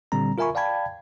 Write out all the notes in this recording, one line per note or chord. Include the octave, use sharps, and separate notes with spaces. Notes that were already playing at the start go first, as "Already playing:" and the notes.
A#2 D3 G3 C4 A#5
F4 A#4 E5 G#5 B5 C#6
D5 F5 G5 A5 B5 G#6